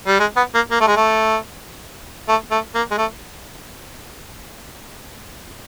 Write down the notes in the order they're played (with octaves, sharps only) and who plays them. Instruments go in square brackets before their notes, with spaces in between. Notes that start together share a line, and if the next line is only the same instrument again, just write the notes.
[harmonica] G3
G#3
B3
A#3
A#3
A3
G#3
A3
A3
A3
A#3
G#3
A3